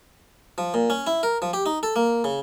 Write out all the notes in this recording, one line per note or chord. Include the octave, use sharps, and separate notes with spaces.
F3
A#2
C#4
E4
A#4
F3
G4
D#4
A4
A#3
C#3